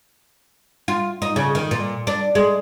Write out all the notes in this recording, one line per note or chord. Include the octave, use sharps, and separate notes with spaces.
F4
D#4
C#3
D#3
A#2
D4
G#3